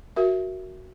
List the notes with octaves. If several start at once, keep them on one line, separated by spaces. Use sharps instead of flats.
F#4 A#4 E5